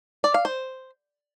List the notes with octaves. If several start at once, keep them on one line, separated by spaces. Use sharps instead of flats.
D5
F5
C5